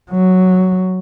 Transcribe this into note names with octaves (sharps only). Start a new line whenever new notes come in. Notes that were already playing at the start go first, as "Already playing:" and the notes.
F#3